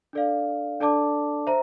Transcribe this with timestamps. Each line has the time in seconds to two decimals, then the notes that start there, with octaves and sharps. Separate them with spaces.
0.13 D4 A4 D5 F5
0.81 D4 A4 D5 A5 D6
1.47 C5 E5 A#5